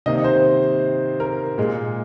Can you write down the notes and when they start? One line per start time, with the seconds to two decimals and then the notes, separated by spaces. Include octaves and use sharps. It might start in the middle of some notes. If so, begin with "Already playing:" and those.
0.06 C3 D#3 A#3 D#5
0.24 C5
1.20 A#4
1.58 A#2 G#3